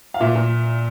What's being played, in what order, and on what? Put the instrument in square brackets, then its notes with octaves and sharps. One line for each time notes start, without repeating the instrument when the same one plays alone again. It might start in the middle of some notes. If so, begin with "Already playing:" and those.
[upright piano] F5
A#2 E5
A#2